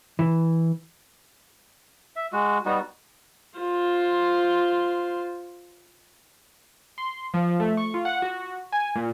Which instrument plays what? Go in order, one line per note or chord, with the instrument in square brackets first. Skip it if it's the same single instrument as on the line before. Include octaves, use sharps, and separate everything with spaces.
[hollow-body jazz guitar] E3
[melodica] E5
G#3 F#4
G3 B3 D#4 F#4
[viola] F4 C5
[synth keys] C6
F3
A3
C#6
F4
F#5
F#4
G#5
A#2